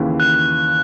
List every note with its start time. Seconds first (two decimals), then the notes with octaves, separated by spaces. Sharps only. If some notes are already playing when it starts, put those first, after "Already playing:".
Already playing: D#2 C#3 E3
0.20 F#6